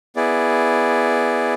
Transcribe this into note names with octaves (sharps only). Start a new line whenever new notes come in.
B3 E4 G#4 D5